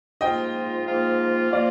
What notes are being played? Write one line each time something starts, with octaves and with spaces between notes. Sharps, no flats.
G#2 F3 A#3 F4 D#5 G5
G#2 F3 A#3 F4
F3 A#3 F4 D5 F5